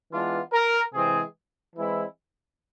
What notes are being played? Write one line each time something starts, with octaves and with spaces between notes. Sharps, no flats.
E3 G#3 B3 D4 F4
A#4
C3 E3 G#3 C4 G#4
E3 G#3 C4 E4